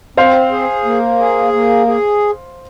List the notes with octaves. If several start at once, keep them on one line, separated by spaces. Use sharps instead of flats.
C4 C5 F5
G#4
A#3
G#4
A#3
G#4